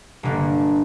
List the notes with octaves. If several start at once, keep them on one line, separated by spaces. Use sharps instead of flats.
G1 D3 A#3